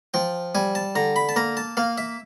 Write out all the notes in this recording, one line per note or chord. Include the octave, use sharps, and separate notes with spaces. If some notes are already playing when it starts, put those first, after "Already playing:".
F3 G5
G3 G#5
A5
D3 A#5
B5
A5
A#3 A#5
A5
A#3 F5
E5